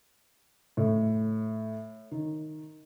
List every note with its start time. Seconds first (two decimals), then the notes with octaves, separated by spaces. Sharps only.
0.77 A2
2.11 D#3